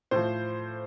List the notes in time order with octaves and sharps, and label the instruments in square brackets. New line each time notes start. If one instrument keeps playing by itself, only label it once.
[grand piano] A2 F3 C5